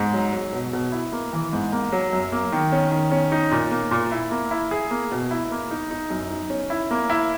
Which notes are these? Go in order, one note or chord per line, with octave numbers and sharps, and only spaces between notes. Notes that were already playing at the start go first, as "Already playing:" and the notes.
Already playing: G#2
F#3
F#3
B2
B2
E4
A#3
E3
G#2
A#3
F#3
F#2
A#3
D#3
C#4
D#3
C#4
D#4
A#2
A#3
A#2
E4
A#3
E4
G#4
A#3
B2
E4
A#3
D#4
D#4
F#2
D#4
C#4
E4
A#3
E4